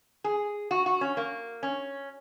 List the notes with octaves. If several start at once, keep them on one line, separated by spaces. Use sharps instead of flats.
G#4
F#4
F#4
C#4
A#3
C#4